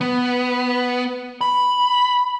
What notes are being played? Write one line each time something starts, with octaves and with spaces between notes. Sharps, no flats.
B3
B5